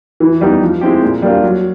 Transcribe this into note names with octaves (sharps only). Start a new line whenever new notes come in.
E3
G3 B3 D#4
F3
G#3 C4 E4 G4
A#2
G3 A#3 D4 F4
F#3